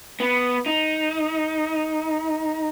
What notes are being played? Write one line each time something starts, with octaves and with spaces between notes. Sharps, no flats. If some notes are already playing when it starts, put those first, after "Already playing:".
B3
D#4